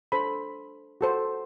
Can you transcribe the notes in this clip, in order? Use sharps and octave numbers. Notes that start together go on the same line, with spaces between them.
D4 A4 C5 B5
F#4 A4 C5